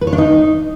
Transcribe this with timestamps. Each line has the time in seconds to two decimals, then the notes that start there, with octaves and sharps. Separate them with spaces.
0.01 B4
0.07 C#5
0.13 D4
0.18 D#4